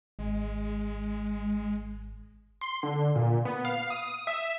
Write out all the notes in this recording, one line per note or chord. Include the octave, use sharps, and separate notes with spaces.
G#1 G#3
C6
D3
A#2
B3
F5
D#6
E5